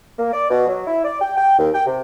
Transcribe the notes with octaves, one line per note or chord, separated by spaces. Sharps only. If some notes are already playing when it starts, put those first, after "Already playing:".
A#3
D5
B2
F#3
E4
D5
G5
G5
D#2
G5
C3